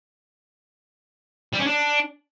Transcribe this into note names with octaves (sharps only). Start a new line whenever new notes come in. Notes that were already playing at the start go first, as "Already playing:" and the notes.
G3
C#4
D4